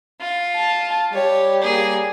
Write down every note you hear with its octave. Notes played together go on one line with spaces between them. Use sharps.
F4
A5
G3 G4 C#5
A#3 G#4